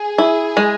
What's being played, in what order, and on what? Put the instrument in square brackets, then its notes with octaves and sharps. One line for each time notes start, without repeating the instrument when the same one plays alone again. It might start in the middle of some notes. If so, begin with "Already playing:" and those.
Already playing: [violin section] G#4
[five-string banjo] E4
G#3